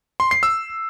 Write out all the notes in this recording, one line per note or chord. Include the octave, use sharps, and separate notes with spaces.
C6
C7
E6